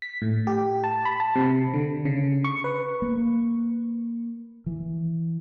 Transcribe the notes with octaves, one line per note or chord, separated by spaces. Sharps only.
B6
A2
G4
A5
B5
A5
C3
D3
C#3
C#6
B4
A#3
E3